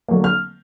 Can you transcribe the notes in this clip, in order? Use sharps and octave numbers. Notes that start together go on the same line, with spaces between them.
D3 F#3 A#3
F6